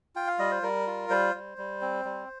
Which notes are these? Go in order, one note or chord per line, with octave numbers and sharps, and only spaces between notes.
F4 G5
F5
G3 D#5
C5
G3 A#4
F4
G3 C5
G3
G3
C4
G3